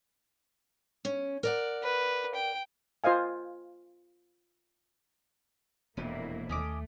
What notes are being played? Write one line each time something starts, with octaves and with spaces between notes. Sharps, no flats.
C#4
A#4 D5 F#5
B4
G5
F4 C5 D#5 F5 G#5
E1 F2 A#2 A#3 E4 F4 G4
D#2 A3 C#4 D#5 D6